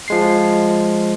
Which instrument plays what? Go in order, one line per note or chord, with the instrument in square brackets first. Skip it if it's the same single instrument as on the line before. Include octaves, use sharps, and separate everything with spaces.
[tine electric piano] F3 G#3 C7